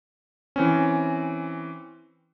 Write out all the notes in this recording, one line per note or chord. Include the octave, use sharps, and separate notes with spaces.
E3 C4 C#4